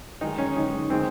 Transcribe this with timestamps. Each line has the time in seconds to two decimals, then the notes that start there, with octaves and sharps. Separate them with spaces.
0.21 D#3 G#3 D#4
0.38 C#4
0.56 D#3 G#3
0.90 D#3 G#3 C4